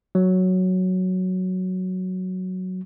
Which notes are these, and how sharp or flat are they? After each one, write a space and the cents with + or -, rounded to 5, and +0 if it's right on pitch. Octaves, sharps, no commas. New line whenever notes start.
F#3 +0